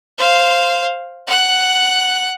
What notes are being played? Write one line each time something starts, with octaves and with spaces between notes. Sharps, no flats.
C5 F5
F#5 F#6